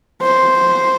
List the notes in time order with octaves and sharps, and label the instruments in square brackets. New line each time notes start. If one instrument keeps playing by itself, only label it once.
[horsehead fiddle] C5